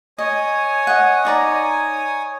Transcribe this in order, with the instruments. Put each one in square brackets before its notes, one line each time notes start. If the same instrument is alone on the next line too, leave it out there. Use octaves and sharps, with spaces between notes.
[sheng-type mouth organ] C#5 G#5 D#6 [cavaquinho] D#5
[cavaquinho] D#5 F#5
D#4 D5 A#5